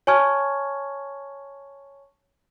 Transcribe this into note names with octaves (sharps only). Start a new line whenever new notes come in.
C#5 G#5 A5 C#6 F6 G#6